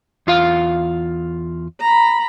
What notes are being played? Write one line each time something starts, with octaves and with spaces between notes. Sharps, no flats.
E2 F4 F5
A#5 B5